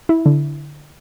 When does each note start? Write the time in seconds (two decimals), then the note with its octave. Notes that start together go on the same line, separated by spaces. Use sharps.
0.09 E4
0.26 D3